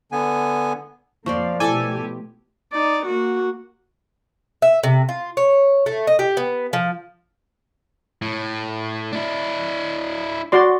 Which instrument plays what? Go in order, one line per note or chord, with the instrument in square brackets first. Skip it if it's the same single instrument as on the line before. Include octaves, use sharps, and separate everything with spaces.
[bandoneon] D3 B3 G#5
[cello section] F2 A#3 F5 [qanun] F3 C5 D5 [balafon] C#6
[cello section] B2 A3 G4 [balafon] E4 [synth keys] A4 G#5
[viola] D#4 D5
A#3 F#4
[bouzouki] E5
C3
F4
C#5
A3
D#5
G4
B3
F3
[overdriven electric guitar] A2
D4 E4
[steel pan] F#4 D5 C6